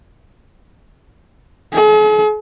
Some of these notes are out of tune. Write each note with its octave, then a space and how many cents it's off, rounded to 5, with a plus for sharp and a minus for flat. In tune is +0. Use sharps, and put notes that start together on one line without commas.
G#4 +45